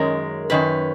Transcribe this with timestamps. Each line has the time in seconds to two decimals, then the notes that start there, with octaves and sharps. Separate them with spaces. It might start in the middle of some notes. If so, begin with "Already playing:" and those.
Already playing: F#2 D#3 G#3 C#4 A#4
0.50 F#2 D#3 C#4 B4